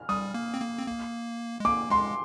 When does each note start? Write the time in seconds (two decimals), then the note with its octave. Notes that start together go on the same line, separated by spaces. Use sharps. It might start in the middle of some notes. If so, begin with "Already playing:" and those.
Already playing: F6
0.09 G3 D#6
0.34 A#3
0.54 C4
0.61 A#3
0.78 C4
0.87 A#3
1.60 G#3
1.65 A#3 D6
1.90 G#3 C6